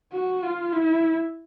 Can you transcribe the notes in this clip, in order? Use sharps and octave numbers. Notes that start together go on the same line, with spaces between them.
F#4
F4
E4